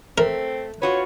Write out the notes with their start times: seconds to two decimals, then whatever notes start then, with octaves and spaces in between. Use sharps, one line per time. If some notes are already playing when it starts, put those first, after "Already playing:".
0.18 A3 C4 A#4
0.82 F4 F#4 B4 C#5